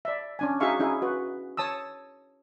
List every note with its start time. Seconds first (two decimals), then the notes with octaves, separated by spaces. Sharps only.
0.05 D5 E5
0.39 C#4 D4 G#5
0.60 D#4 F#4 G#4 E5 F5 C#6
0.80 C#4 D#4 E4 G#4
1.02 F#4 B4
1.57 C#5 A5 D#6 E6